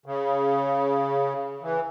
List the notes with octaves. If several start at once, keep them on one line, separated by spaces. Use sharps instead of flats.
C#3
E3